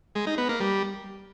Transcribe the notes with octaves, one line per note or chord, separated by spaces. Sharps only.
G#3
D#4
B3
A#3
G3